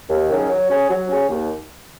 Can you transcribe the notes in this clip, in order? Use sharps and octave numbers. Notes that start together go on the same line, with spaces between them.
D#2
D#3 F#3 C#4 G#4
F#3
C#4 G#4 C#5
F#3
C#4 G#4 C#5
D#2